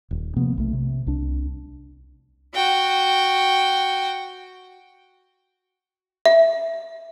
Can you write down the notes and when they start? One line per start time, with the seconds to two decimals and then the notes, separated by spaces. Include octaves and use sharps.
0.11 D#1
0.37 C3 F3 A#3 B3
0.57 B1 A3
0.73 C3
1.07 C2 D4
2.55 F#4 G5
6.26 E5